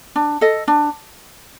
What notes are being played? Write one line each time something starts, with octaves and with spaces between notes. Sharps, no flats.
D4
A4 D#5
D4